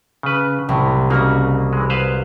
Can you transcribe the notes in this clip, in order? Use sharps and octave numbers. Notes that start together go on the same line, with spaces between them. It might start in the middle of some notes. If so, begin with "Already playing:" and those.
C#3 B4
C2 A2
C#3 A#3 F#4 D#5
E3 G#3
B4 C5 F5